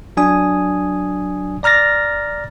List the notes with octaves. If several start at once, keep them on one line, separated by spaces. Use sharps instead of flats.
F#3 D4 G#5 D#6
D5 A#5 F6 A6 A#6